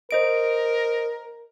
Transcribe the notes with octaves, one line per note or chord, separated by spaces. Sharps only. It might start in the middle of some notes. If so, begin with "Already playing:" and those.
A#4 C5 D#5 D7